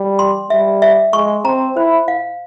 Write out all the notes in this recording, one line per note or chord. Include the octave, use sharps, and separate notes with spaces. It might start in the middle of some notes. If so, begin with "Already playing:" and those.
Already playing: G3
C6
G3 E5
E5
G#3 C#6
C4 A#5
E4 C5
F5